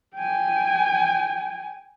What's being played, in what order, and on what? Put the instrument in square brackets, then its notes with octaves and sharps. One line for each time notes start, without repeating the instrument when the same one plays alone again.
[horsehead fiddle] G5 G#5